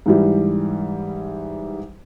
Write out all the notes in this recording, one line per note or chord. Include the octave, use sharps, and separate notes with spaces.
G#2 E3 G3